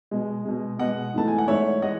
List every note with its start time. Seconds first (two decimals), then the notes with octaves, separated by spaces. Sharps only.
0.11 B2 G#3
0.45 B2 G#3
0.79 B2 G#3 D#5 F#5
1.14 G#2 E3 A3 A5
1.28 G#5
1.38 F#5
1.48 G#2 E3 A3 C#5 E5
1.82 E3 G#3 D#5 F#5